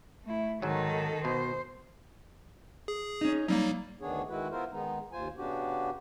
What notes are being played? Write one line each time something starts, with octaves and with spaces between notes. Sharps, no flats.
A3 E4
G#2 D#3 F#3 A4
B2 C5
G#4
C#4 D#4
F#3 G3 A#3 D#4
D2 D#3 B3 D4 G#4 C#5
D#3 G#3 E4 F#4 B4
B3 E4 F4 A#4 C5
D#3 G#3 B3 D#4
D#2 F4 C5 G#5
C#3 B3 D4 F#4 G4